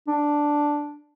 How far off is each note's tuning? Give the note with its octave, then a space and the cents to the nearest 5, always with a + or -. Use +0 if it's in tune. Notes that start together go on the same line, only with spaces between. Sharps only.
D4 +0